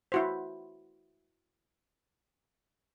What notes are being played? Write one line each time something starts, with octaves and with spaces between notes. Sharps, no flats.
E4 F#4 C5